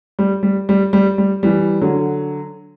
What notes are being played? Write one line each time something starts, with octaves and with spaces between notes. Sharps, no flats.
G3
G3
G3
G3
G3
E3 G3
D3 F#3